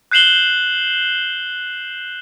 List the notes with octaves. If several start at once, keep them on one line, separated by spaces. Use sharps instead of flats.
F#6 G6 C7 E7 F#7 G7